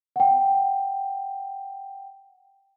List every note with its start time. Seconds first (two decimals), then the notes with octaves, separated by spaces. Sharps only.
0.16 F#5 G5